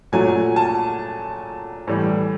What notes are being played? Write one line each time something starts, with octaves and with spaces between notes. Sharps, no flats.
A#2 F#3 A3 G#5
A5
A2 E3 G3